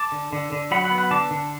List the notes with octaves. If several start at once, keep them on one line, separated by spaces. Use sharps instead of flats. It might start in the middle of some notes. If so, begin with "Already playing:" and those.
Already playing: A5 D6
D3
D3
D3
F#3 F#5 B5
F#5 B5
B3
F#5 B5
D3 A5 D6
D3